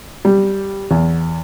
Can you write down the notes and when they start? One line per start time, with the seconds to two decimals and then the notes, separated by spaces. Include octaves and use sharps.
0.25 G3
0.91 E2